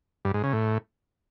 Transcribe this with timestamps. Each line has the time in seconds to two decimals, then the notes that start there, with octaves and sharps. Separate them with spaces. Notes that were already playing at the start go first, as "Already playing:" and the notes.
0.25 G2
0.34 G#2
0.44 C#3
0.53 A2